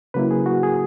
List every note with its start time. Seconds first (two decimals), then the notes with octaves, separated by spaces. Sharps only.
0.14 C#3 F#3 A#3 E4 B4
0.31 G#4
0.46 F#4
0.63 G#4